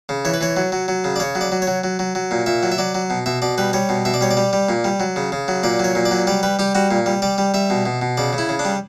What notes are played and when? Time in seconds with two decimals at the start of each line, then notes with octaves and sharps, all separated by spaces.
0.09 C#3
0.25 E3 C#5
0.34 B4
0.41 E3 C#5
0.56 F#3
0.72 F#3
0.88 F#3
1.04 C#3
1.16 D5
1.20 C#3 C#5
1.35 F#3
1.41 D5
1.52 F#3
1.62 C#5
1.67 F#3
1.84 F#3
1.99 F#3
2.15 F#3
2.31 A#2
2.46 A#2 E5
2.63 F#3
2.72 E5
2.78 F#3 D5
2.95 F#3
3.10 B2
3.26 B2 E5
3.42 B2 D5
3.58 G3 B4
3.73 G3 C#5
3.89 B2
4.05 B2 E5
4.14 D5
4.21 G3 C#5
4.31 D5
4.37 G3
4.53 G3
4.69 A#2
4.84 G3
5.00 F#3
5.16 C#3
5.32 C#3
5.48 F#3
5.63 A#2 D5
5.79 F#3
5.84 C#5
5.95 A#2
6.05 D5
6.11 F#3
6.27 G3 D5
6.43 G3 B4
6.59 G3 G4
6.75 G3 F#4
6.91 A#2
7.06 G3
7.22 G3 D5
7.38 G3
7.54 G3 E5
7.70 B2
7.86 B2
8.02 B2
8.17 C#3 D5
8.33 C#3
8.38 E4
8.49 C#3
8.59 D4
8.65 G3